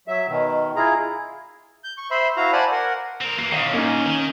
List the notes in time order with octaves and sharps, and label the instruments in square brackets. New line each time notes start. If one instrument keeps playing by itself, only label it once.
[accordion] F#3 E5
B2 D#3
E4 F4 G#4 A#5
[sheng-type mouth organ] G6
C#6
C5 E5 B5 C6
E4 F#4 F5 A#5
C5 D5 F#5 G#5 A5 B5
A#4 F#5
[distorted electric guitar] C4 A#4
[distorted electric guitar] E3 A#3 [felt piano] C7
[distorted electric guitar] A#2 D#3 [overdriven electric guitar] D#5 F5
[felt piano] A#3 D#4 [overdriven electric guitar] C#4
[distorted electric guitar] D#3